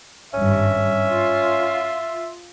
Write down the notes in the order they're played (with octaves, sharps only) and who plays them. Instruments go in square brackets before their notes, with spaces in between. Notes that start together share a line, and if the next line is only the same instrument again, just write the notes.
[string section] G#1 G2 [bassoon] C#4 [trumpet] E5
[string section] F4